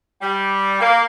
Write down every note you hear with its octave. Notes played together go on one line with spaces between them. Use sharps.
G3
A#3